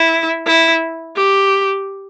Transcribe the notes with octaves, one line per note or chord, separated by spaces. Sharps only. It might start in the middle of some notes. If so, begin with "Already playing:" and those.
Already playing: E4
E4
G4